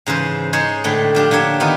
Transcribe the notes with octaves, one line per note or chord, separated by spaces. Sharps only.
G#2 C#3 E3 C5
G#3 D#4 C5 C#5
A2 D3 A3 G5
F3 D4 G4
D3 A#3 G4 C#5 E5
D#3 B3 D#4 F4